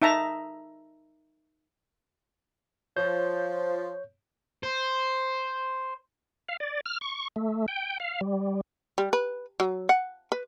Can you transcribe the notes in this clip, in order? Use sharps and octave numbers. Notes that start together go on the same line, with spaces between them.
D#4 E5 A5 A#5
F3 C#5 G6
C5
F5
D5
F6
C#6
A3
G5
F5
G3
G3
B4
F#3
F#5
B4